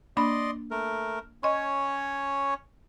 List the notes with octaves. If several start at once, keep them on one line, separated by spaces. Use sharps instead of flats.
A#3 D4 D5 D#5 B5 C6
A3 A#4
C#4 C#5 D#5 C6